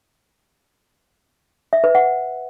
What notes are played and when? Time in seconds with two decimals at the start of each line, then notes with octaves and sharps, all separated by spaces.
1.73 E5
1.84 B4
1.95 F#5